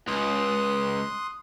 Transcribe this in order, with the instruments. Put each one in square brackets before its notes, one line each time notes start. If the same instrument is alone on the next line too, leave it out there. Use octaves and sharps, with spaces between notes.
[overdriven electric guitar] C#2 [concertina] C6 D#6 F#6